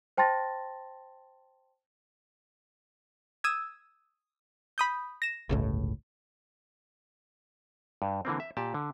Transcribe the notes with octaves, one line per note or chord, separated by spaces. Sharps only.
C5 G5 A5 C6 A6 A#6
D#6 E6 G#6
B5 D#6 G6
A#6 E7
G1 C#2 A2
G2
D3 E3 A#3 C4
E5
A#2 G4 A5
D3